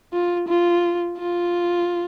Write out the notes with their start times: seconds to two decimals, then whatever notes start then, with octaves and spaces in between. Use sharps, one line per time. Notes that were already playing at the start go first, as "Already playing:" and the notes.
0.13 F4
0.48 F4
1.18 F4